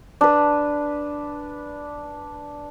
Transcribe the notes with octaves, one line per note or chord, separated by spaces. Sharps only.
D4 B4